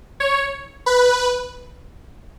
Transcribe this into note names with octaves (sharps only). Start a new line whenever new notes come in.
C#5
B4